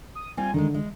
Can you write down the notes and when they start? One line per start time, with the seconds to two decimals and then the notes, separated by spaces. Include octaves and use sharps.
0.15 D#6
0.37 G3 C4 F4 G#5
0.54 D3 D#3 G3 G#3
0.74 G#3